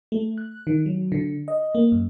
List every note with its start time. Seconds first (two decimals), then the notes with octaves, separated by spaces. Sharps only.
0.12 A3
0.38 F#6
0.67 D#3
0.86 F#3
1.12 D3
1.48 D#5
1.75 A#3
1.92 F#2